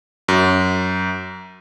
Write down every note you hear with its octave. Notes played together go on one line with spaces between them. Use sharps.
F#2